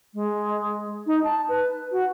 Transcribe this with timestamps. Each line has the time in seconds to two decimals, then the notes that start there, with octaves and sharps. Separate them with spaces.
0.14 G#3
1.07 D#4
1.24 A5
1.49 B4
1.92 F#4